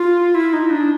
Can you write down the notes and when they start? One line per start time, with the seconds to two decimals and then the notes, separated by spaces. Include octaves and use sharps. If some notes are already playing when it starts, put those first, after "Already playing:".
Already playing: F4
0.35 E4
0.53 D#4
0.71 D4